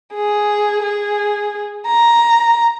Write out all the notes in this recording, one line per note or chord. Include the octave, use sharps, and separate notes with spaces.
G#4
G#4
A#5